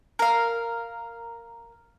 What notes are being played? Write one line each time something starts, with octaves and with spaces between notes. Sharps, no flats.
A#4 F5